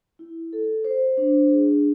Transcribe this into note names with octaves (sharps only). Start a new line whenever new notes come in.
E4
A4
C5
D4
G#4